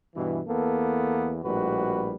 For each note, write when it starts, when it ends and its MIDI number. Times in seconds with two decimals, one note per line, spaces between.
0.15 0.41 43
0.15 0.41 47
0.15 0.41 52
0.47 1.38 40
0.47 1.38 58
0.47 1.38 59
0.47 1.38 69
1.43 2.15 34
1.43 2.15 45
1.43 2.15 55
1.43 2.15 66
1.43 2.15 71